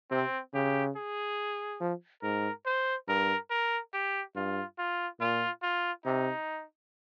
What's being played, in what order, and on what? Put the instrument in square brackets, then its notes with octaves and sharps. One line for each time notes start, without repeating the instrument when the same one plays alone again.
[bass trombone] C3 [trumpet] C4
[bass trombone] C#3 [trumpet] G4
[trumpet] G#4
[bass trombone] F3
[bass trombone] G#2 [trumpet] A#4
[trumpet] C5
[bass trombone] G2 [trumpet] A#4
[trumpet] A#4
G4
[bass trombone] G2 [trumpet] F4
[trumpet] F4
[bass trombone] A#2 [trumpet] F4
[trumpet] F4
[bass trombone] C3 [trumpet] D#4